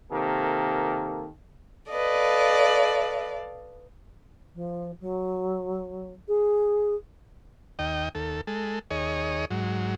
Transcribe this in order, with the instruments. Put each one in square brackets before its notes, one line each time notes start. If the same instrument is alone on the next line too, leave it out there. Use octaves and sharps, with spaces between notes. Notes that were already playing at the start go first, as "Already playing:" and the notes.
[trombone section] C3 D#3 A#3 A4
[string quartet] A4 D5 F5 [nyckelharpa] B4 D#5
[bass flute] F3
F#3
G#4
[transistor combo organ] D#2 D#5 G5
D#2 A4
G#3 A4
D#2 G#4 C#5 D#5
G#2 F#3